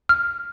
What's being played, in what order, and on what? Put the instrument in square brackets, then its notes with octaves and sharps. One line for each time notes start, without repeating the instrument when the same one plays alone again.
[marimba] F6